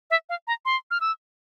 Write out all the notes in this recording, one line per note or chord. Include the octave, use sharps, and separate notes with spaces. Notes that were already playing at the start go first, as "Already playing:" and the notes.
E5
F5
A#5
C6
F6
E6